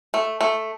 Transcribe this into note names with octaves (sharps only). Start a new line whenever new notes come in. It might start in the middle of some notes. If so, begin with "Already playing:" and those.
A3
A3